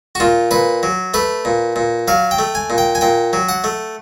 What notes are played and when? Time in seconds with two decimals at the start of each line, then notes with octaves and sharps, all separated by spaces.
0.15 F#4
0.20 A#2 F4
0.51 A#2 B4
0.83 F#3
1.14 A3 B4
1.45 A#2
1.76 A#2
2.08 F#3 F5
2.31 G5
2.38 A3
2.55 G#5
2.70 A#2
2.78 G5
2.95 G#5
3.01 A#2 G5
3.33 F#3
3.49 F#5
3.64 A3